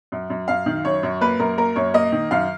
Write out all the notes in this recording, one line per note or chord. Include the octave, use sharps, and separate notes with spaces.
F#2
F#2
F#2 F5
D#3
F#2 C#5
F#2
A#3 B4
F#2 A#4
A#3 A#4
F#2 C#5
A#3 D#5
D#3
F#2 F5